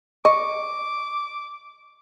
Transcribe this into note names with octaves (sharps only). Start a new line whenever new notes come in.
D#5 C#6 D6